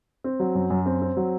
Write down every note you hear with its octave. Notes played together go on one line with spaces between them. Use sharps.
C4
F#3
F#2
F#2
C4
C4
F#3